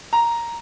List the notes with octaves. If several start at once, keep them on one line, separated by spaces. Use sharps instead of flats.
A#5